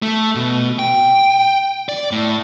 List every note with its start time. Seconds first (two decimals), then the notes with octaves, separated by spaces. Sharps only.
0.02 A3
0.35 B2
0.79 G5
1.89 D5
2.11 A2